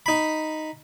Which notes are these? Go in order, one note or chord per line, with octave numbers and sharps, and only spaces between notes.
D#4 B5